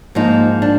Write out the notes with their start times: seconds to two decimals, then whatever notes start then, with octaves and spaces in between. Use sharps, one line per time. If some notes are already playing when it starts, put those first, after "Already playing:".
0.15 G#2 F3 A#3 D#4
0.62 D4